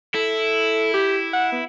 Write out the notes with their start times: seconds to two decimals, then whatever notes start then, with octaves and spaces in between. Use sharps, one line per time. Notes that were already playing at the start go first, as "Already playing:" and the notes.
0.15 E4 A4
0.94 G4
1.33 F#5
1.52 B3